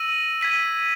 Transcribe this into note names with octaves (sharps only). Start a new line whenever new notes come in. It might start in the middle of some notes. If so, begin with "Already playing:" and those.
Already playing: E6 A#6 D#7 F#7
G#6 B6 D#7